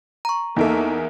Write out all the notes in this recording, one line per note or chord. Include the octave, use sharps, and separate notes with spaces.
A#5 C#6
E2 A#3 D#4 A4 A#4 E5